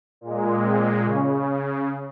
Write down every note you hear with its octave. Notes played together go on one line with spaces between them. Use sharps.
A#2 G#3
C4
C#3 C#4